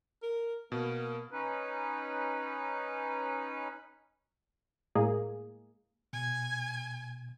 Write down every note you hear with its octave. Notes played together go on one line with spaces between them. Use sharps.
A#4
B2 A#3
C#4 D#4 B4
A2 G#3 A#3 G#4
B2 G#5